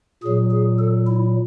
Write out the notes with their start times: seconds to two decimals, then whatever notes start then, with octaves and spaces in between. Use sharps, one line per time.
0.23 A#2 G#4
0.27 F#3
0.51 G#4
0.79 A4
1.07 E4